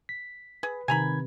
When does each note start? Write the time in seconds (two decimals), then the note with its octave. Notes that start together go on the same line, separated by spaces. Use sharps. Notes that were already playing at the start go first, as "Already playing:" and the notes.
0.09 B6
0.63 G#4 B4
0.88 C3 D#3 G#5 A#5 B5 G#6